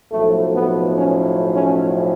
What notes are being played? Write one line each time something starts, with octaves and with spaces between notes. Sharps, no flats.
B1 A2 F3 A3
B3
C#4
C#4